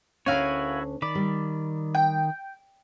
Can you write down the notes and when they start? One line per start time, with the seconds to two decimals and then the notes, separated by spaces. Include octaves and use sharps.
0.26 D2 C#4 E4 F#4 A#4 C#5 F5 G#5
1.02 D#3 D5 B5 D6
1.15 G3
1.95 G5